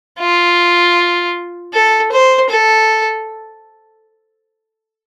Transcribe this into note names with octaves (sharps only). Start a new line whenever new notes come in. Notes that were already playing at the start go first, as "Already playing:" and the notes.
F4
A4
C5
A4